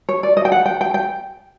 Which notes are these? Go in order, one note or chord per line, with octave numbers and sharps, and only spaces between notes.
C#5
D5
D#5
G5
F#5
G5
G5
G5